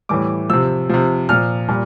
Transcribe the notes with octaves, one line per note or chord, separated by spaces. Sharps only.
A2 E3 G3 D6
C3 F3 E6
C3 F3
A#2 F3 F6
A#2 G3